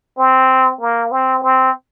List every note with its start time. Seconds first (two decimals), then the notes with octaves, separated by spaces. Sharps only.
0.18 C4
0.80 A#3
1.11 C4
1.43 C4